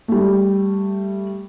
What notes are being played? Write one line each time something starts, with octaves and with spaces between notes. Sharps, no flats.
G3 A3